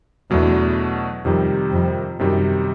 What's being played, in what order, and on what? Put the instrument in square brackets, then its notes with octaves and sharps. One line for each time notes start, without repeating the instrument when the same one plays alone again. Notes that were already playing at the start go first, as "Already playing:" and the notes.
[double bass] E2 [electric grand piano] B2 F#3 A3 D4
[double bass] F2 [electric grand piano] C3 D#3 G3
[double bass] F2
[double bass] F#2 [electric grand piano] C3 D#3 G3